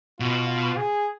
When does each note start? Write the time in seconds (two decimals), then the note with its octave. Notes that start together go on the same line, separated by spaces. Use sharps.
0.20 B2 F4
0.48 F4
0.77 G#4